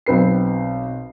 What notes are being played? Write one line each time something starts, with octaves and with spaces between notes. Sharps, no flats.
B1 C4 B4 C7